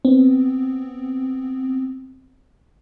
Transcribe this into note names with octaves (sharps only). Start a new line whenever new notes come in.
B3 C4